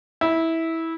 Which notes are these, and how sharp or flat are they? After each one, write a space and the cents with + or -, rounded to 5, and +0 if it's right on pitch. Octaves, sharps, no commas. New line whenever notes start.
E4 -15